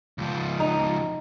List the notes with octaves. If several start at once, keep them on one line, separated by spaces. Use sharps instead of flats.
C#2 F3
D#4